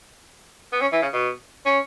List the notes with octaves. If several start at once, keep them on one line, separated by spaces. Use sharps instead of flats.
B3
C#4
E3
C#3
B2
C#4